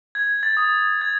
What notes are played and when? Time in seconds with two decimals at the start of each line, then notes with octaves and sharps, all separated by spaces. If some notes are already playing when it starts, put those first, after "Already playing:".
0.15 G#6
0.43 A6
0.57 D#6
1.01 G#6